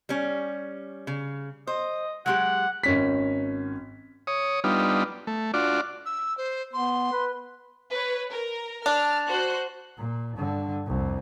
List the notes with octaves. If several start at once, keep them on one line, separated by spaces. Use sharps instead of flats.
G3 C#4
C#3
C5 D#5
F#3 G#3 G4 F#5
G#1 C#4 B6
C#5 D#6
G3 B3 D4 D#4 F4
A3
D4 F4 F#4 D5
E6
C5
B3 C6
B4
B4 C#5
A#4
D4 A5 F6
F#4 C5 F#6
A#2
G2 D3
C2 F2